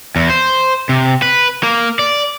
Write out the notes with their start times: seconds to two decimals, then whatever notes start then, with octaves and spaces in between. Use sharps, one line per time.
0.16 E2
0.30 C5
0.89 C3
1.22 B4
1.63 A#3
1.99 D5